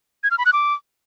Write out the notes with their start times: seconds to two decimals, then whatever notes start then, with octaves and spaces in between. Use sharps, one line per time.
0.23 G#6
0.31 F6
0.38 B5
0.46 F#6
0.53 D6